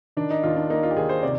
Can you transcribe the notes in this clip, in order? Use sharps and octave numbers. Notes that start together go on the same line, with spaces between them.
D#3 D4
D#4
D#2 F4
D4
A#3 D#4
F4
G4
D#2 G#4
C5
C3 D5